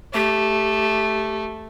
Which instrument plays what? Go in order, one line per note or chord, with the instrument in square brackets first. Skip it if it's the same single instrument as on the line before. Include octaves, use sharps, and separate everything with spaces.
[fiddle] A3 [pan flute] G4